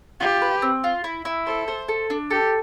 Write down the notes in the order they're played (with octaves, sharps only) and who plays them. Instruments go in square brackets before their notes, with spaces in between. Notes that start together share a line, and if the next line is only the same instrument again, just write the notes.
[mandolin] F4 [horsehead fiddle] G4
[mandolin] B4
C4
F4
E4
E4
[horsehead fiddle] A4 [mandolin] C5
[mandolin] C5
A4
D4
[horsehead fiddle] G4 [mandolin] A4